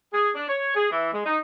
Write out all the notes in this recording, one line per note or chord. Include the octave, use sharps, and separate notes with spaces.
G#4
D4
C#5
G#4
E3
G#3
D#4